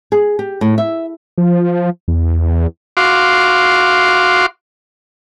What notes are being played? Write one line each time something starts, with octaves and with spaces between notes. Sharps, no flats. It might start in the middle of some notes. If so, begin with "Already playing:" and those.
G#4
G4
A2
E5
F3
E2
F#4 F5 C6 D6